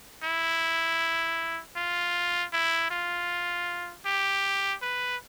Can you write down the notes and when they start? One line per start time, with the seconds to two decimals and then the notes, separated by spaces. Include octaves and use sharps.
0.23 E4
1.76 F4
2.53 E4
2.91 F4
4.06 G4
4.82 B4